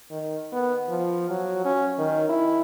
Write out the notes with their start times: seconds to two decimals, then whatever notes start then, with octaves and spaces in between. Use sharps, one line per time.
0.11 D#3
0.52 B3
0.89 F3
1.30 F#3
1.65 C#4
1.99 D#3
2.29 E4